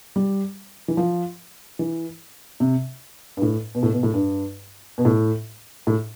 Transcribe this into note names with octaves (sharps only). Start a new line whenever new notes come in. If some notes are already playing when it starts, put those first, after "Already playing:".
G3
E3
F3
E3
C3
G2
A2
B2
A2
B2
A2
G2
B2
A2
A2